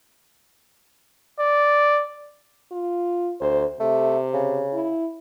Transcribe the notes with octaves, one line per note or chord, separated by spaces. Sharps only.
D5
F4
D2 C5
C3 A3
C#3
E4